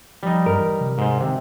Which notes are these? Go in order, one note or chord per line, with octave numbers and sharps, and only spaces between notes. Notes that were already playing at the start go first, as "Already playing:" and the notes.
F3 G3 D#4
G2 A#4
E3
C3
G#2 C5
C3 D#3